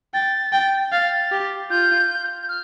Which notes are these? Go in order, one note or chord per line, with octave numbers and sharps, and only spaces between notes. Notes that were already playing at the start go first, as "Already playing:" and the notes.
G5 A6
G5
F5 A6
G4
F4 G6
F6